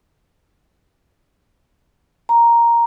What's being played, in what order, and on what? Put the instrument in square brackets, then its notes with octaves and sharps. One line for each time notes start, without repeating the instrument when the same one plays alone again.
[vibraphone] A#5